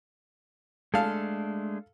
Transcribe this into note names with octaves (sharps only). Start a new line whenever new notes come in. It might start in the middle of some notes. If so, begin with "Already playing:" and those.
G#3 A3 D4 A4 F5